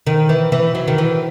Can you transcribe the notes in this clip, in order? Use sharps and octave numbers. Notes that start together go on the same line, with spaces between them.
D#3
E3
E3
F#3
D#3
E3